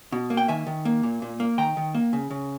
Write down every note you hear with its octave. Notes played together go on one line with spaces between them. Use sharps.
B2
A#3
G5
D#3 E5 G#5
D#3
A#3
A#2
A#2
A#3
D#3 G5 A#5
D#3
A#3
C#3
C#3